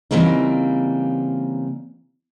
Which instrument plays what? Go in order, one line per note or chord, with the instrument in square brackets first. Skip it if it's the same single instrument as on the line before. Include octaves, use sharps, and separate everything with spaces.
[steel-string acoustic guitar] C#3 E3 G3 A#3 C4 D#4